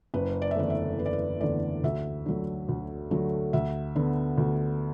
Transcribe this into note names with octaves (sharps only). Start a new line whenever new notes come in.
F#1 B4
D5
E5
E2 D3 A3 D5
E5
F#1 B4
D5
B4
E2 D3 A3 D5
D2 E5
D3 F#3 A3
D2
D3 F#3 A3
D2 E5
D3 B3
D2